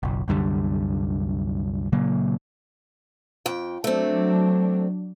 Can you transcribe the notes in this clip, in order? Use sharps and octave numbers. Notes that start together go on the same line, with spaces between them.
F#1 B1
C2 F#2 D3 G3
A#2 C#3 F#3 A#3
F2 G5
F#3 A3 C4 D4